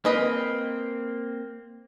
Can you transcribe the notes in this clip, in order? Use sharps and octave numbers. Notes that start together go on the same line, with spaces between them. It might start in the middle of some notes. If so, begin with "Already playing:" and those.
A#3 C4 B4 D#5 B5